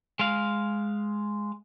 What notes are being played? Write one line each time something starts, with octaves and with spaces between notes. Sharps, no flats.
G#3 F5